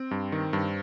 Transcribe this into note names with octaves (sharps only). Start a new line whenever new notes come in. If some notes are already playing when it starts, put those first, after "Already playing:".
Already playing: C4
G2
D#3
G2